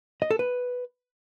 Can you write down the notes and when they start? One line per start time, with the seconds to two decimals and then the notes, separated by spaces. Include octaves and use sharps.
0.22 D#5
0.31 A4
0.39 B4